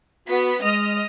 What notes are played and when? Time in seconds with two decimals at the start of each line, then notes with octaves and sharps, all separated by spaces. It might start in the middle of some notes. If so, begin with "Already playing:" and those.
0.28 B3 F#4 B6
0.61 G#3 D#5 F6